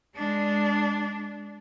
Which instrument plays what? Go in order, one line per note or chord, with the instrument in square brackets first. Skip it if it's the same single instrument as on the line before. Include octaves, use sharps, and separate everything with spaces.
[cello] G#3 D4